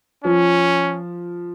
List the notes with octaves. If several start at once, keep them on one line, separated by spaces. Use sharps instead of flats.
F3 C#4